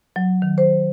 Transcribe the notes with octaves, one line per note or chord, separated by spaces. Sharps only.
F#3
D#3
C5